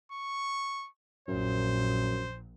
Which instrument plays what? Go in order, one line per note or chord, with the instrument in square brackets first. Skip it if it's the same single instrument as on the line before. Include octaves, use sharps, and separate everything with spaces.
[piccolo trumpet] C#6
[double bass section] A#1 A#2 [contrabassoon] F#2 [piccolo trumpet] C5